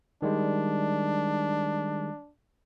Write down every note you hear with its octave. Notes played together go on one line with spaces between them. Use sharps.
D#3 G3 G#3 D4